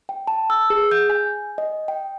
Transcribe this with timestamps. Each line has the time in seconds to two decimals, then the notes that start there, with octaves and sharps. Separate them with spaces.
0.09 G5
0.27 A5
0.50 E6
0.70 G#4
0.91 G6
1.10 G#5
1.58 D#5
1.88 G5